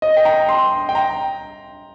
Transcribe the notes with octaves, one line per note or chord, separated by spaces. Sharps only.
D#5
G5
A#5
C6
G5
A#5